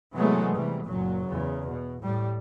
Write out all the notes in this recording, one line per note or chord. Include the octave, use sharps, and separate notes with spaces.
C3 E3 F#3 G#3 A3 B3
C3 E3 G3
F#1 A#2 F#3
E2 C#3
B2
A2 G3